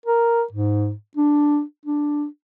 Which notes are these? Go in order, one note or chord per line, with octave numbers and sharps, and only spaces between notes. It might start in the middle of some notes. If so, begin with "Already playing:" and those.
A#4
G#2
D4
D4